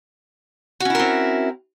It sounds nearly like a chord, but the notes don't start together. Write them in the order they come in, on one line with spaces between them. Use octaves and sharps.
F#4 C#4 E4 A#4 C4